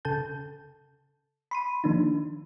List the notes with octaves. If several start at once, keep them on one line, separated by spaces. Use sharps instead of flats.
C#3 A4 A5 G6
B5 C6 D#7
D#3 F3 A#3 D4 D#4